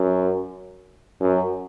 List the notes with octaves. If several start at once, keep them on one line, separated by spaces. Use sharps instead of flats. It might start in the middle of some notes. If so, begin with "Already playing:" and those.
Already playing: F#2
F#2